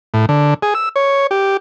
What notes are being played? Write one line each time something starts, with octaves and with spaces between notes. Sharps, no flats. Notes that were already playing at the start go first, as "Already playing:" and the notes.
A2
D3
G#4
E6
C#5
G4